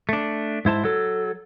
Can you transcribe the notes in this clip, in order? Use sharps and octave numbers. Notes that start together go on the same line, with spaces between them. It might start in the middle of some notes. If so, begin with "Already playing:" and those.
A3 D4
G#2 E4 C5 A5
F#3 A4